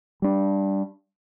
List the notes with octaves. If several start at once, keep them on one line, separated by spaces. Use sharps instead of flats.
G3 D4